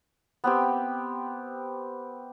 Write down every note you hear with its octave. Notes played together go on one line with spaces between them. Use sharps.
B3 C4 G4